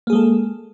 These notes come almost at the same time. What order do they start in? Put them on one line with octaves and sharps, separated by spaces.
A#3 G#4 G#3 A4